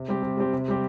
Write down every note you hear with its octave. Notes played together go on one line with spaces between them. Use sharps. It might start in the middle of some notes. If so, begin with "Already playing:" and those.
Already playing: C3
G3 C4 G4
C3
G3 C4 G4
C3
G3 C4 G4